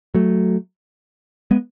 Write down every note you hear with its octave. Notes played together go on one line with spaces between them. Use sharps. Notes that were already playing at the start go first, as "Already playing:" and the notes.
F#3 A3
G#3 B3